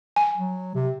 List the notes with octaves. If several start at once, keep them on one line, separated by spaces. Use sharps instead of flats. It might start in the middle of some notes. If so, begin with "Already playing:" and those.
G#5
F#3
C3